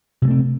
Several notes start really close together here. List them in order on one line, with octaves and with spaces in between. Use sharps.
C3 G#3 A3 C4